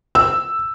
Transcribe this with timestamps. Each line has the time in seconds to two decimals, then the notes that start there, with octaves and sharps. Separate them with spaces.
0.15 E6